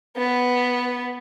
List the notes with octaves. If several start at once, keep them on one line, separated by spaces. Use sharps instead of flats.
B3